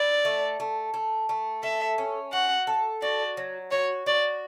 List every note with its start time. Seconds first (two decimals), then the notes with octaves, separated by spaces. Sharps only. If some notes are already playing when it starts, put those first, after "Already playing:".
Already playing: E4 D5
0.25 A3
0.60 A3
0.94 A3
1.29 A3
1.63 A4 E5
1.98 C#4
2.32 F#4 F#5
2.67 A4
3.02 F#4 D5
3.37 F#3
3.71 F#4 C#5
4.06 F#4 D5